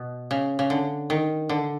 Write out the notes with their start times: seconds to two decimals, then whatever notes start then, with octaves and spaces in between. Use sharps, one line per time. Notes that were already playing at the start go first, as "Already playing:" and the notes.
Already playing: B2
0.31 C#3
0.59 C#3
0.70 D3
1.10 D#3
1.49 D3